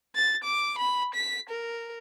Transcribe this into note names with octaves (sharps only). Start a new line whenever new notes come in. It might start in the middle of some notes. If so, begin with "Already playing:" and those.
A6
D6
B5
B6
A#4